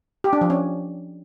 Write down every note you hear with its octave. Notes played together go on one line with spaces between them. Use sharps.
G4
D4
F3
C#4